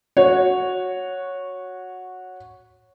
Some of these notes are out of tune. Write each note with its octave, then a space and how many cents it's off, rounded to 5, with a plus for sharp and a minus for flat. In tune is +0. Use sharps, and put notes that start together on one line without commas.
F#4 -10 C#5 +0